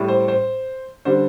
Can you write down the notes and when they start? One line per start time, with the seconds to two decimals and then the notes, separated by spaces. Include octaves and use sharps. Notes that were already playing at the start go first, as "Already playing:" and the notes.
Already playing: A2 G3
0.08 C5
0.28 C5
1.05 D3 G3 C5